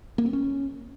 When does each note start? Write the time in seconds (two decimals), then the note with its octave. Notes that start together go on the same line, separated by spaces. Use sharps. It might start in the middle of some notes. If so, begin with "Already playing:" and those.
0.18 A#3
0.26 C4
0.33 C#4